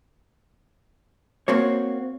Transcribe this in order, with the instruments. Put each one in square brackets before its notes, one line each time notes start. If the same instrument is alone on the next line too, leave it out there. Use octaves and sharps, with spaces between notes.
[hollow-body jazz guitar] A#3 C4 F#4 C#5